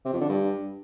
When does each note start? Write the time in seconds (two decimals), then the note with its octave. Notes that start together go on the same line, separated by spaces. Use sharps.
0.05 C3
0.13 F2
0.21 D3
0.29 G2